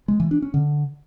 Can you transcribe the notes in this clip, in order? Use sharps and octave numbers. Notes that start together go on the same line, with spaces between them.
G#3
E3
D4
C#4
D3